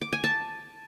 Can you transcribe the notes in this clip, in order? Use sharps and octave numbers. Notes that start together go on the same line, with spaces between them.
D6
G#5
A5